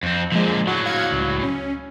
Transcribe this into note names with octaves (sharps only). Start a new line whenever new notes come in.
F2 C4
A#2 D3 F3 G#3
A2 F#3 F#4
F5 G#6 C#7
C#2
C#4